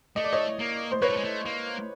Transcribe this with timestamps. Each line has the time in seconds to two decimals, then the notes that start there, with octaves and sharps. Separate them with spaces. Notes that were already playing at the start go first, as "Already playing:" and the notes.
0.16 A3 D#5
0.24 D5
0.33 C#5 D#5
0.59 A#3
0.92 C5
1.02 A#3 B4 C#5
1.09 A3
1.17 G#3
1.24 A3
1.46 A#3